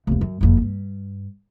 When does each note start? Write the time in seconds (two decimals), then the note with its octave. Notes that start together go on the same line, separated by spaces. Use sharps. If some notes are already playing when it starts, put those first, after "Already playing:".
0.07 F1 E2
0.21 F#2
0.41 F#1 F2
0.61 G2